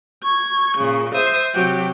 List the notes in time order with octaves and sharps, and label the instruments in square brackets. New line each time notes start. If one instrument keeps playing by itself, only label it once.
[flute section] C#6 [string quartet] G#6
[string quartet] A#2 C#3
[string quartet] C5 E5 D#6 [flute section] G6
[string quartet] C3 F#3 G4